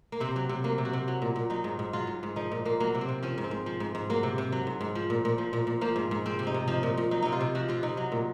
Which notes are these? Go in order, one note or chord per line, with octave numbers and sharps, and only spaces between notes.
A#3
C3 C4
F#3
C3
F#3 A#3
C3
F#4
C3
F#3
A#2
A#2
F#3 D#4
G#2
G#2
F#3 F4
G#2
G#2
F3 D#4
A#2
A#2 A#3
F#3 A#3
C3
C4
C3
F3 C#4
G#2
C4
G#2
F3
G#2
G#2
F#3 A#3
C3
C3
F#3
G#2
G#2
F3
A#2
A#2
F3
A#2
A#2
F3 A#3
G#2
G#2
F3 C4
C3
D#4
C3
F3 D#4
A#2
A#2
F#3 D#4
C3 D#4
F4
C3
F3 F#4
C3 F4
C3 D#4
F#3
A#2